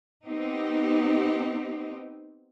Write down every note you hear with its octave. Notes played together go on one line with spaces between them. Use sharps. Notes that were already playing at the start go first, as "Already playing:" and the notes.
B3 C4 D#4 G4